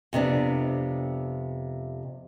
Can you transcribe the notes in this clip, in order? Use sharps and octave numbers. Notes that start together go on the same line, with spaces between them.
F2 C3 B3 D4